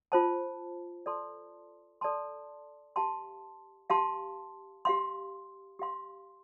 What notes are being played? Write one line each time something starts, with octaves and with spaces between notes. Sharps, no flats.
F4 C5 A5
A4 D5 A5 C6
A4 D5 A5 C6
G4 F5 A5 C6
G4 F5 A5 C6
G4 F5 C6
G4 F5 C6